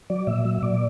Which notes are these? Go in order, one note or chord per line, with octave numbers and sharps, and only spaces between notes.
F#3 D5
A#2 E5
F#3
E5
A#2 D5